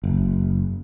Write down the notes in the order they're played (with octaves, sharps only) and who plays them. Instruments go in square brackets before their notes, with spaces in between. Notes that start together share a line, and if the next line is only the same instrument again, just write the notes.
[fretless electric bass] F#1